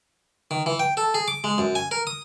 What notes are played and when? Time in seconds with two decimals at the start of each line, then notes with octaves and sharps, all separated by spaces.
0.51 D#3
0.66 E3
0.79 G5
0.97 A4
1.14 G#4
1.28 D6
1.44 G#3
1.58 F#2
1.75 G#5
1.91 A#4
2.07 D#6